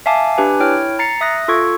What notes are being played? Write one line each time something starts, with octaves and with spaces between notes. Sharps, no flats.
E5 F5 G#5 A5 D6
D4 G4 B4 G#5
E4 C#5 G5 F6
A#5 A6 C7 C#7
E5 D#6 F#6 A#6
F4 A4 C#6 G#6